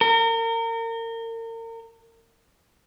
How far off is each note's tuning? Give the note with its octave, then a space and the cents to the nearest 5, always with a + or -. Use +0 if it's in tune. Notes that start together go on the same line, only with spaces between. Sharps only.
A#4 -35